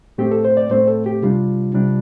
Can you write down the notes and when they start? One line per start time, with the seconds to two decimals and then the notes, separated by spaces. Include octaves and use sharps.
0.18 A2 A3 C4 G4
0.31 A4
0.45 C5
0.57 D5
0.70 A2 A3 C4 C5
0.87 A4
1.06 G4
1.22 C3 G3 D4 F4
1.75 C3 G3 D4